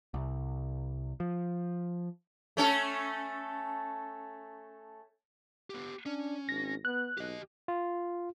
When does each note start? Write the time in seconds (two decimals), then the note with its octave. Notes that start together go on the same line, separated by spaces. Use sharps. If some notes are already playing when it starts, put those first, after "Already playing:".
0.14 C2
1.20 F3
2.57 A3 C#4 A4
5.70 B3 G4
6.06 C#4 D4
6.49 G#1 A#6
6.85 B3 F#6
7.17 B1 G4 D#5
7.68 F4